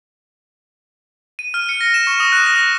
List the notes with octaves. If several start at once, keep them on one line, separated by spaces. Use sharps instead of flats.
D#7
F6
C#7
A#6
E7
C#6
D#6
F#6
A#6